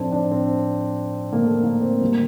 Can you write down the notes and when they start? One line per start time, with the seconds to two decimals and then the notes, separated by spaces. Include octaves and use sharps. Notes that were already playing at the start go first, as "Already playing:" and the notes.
Already playing: A2 F3 A3 C4 D4
0.12 D4
0.31 C4
1.33 A#3
1.45 A3
1.64 A#3
1.82 C4
2.01 D3 G3 A#3